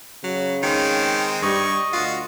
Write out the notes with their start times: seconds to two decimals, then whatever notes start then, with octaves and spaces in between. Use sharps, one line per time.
0.24 C#3 F#3
0.63 D#3 G#3 C4
1.42 G2 G3 D#5 C#6
1.93 D2 F4 F#4